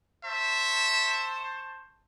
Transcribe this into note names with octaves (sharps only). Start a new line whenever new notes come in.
C5 E5 A5 C#6